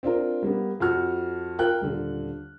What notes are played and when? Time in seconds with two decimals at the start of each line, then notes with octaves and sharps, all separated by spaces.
0.03 C4 D4 F4 A#4
0.42 G3 A#3 B3
0.80 F2 F#4 F6
1.59 F4 A#4 G5 F#6
1.81 D#1 D3